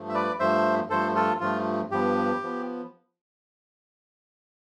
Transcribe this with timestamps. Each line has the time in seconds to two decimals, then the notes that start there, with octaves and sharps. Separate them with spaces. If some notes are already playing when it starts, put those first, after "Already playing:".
Already playing: G2 F3 A3
0.09 E5
0.14 B4 D5
0.39 G2 F3 A3 C5 E5
0.90 G2 F3 A3 A4 C5
1.15 F4 A4
1.40 G2 F3 A3 F4
1.91 G2 F3 B3 G4
2.43 F3 B3